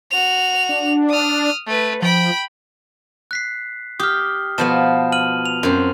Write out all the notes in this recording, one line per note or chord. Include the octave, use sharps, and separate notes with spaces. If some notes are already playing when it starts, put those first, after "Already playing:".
F#4 F7
D4
D#6 F6
A3 B4
F3 G5 B5
F#6 B6 C7
G4 D#6 F6
B2 F3 B3 A5 E7
F6 D#7 F#7
F7
F#2 C4